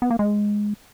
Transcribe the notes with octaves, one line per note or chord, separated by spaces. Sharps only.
B3
A#3
G#3